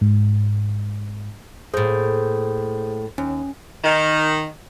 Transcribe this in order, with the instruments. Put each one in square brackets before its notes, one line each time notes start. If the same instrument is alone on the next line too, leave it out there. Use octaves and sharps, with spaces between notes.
[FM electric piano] G#2
[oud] A2 A#3 [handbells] G#4 C5
[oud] D#2 [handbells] C#4
[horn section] D#3